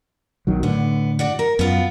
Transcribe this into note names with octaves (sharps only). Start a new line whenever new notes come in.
B1 D#3 F#3
A2 D3 B3
F#4 D5 F#5
A#4
F#2 B3 F4